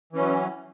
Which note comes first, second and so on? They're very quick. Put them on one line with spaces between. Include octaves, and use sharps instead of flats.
E3 C#4 F#3